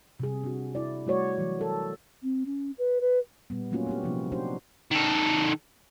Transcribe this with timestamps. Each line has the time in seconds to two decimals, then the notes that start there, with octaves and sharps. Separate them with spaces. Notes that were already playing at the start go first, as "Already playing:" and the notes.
0.20 C3 G3 G#4
0.43 D4 F#4
0.75 E4 D5
1.06 G3 A3 F#4 C#5 D5
1.38 E3 F#3
1.59 F#3 A4 A#4
2.23 C4
2.46 C#4
2.78 B4
3.01 B4
3.50 A#2 G3 B3
3.71 F#3 A3 A#3 C#4 F4 F#4
3.87 B3 D4 G4
4.03 C3 F3 F#3 A#3 C4 E4
4.32 C4 D4 D#4 F#4 G4 C5
4.91 D#3 A4